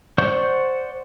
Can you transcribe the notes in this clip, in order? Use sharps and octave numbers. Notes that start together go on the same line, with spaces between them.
C5 D5 F#5 C#6 G6